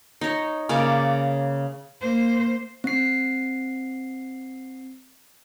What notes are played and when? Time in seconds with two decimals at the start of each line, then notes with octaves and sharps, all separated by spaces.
0.21 D#4 C#5
0.69 C#3 A#3 D5
2.01 A#3 C5
2.84 C4 C7